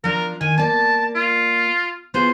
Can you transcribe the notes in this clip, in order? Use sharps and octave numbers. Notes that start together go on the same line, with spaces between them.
F3 D4 A#4
D#3 G#5
A#3 D5 A5
F4
B3 F4 G#4 C5